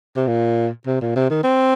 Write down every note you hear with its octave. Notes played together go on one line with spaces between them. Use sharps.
C3
A#2
C3
A#2
C3
D#3
C4